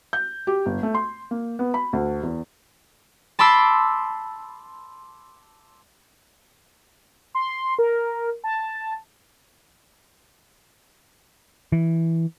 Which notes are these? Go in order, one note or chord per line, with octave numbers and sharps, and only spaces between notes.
G6
G4
G1
A3
C6
A#3
B3
B5
D2
E2
A5 B5 C6 D6 E6
C6
A#4
A5
E3